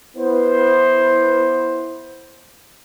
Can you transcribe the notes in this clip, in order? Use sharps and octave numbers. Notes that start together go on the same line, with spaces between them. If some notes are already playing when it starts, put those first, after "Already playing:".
B3 E4 C5